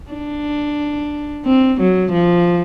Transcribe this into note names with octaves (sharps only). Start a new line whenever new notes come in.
D4
C4
F#3
F3